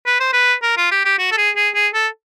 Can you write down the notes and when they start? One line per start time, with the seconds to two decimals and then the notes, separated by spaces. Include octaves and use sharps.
0.06 B4
0.20 C5
0.33 B4
0.62 A#4
0.77 F4
0.91 G4
1.05 G4
1.19 F#4
1.32 A4
1.37 G#4
1.56 G#4
1.75 G#4
1.94 A4